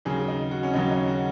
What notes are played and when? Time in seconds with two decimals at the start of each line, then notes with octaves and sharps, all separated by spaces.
0.05 D#2 C#3 F#3 G#4
0.28 D#4
0.51 F#4
0.63 C#4
0.74 D#2 C#3 F#3 D#4
0.91 D#4
1.08 F#4